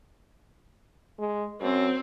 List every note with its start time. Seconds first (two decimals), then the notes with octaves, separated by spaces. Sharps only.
1.18 G#3
1.61 F#2 C4